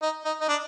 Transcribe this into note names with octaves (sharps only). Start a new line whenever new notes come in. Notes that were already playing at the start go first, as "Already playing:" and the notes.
D#4
D#4
D#4
D4